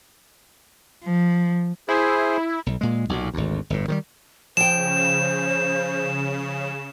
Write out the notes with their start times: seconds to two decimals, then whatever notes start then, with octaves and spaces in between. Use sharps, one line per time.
1.04 F3
1.89 E4 G#4 C5
2.66 B1
2.81 A#2 G#3
3.09 B1 A#2
3.34 G#1 D2
3.70 G1 A2
3.88 D#3 F3 G3
4.57 C#3 F3 C5 G5 E7